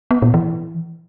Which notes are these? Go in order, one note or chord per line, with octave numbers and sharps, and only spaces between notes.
B3
A#2
E3